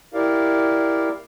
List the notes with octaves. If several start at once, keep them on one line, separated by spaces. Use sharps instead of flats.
E4 G4 A#4 D5 F5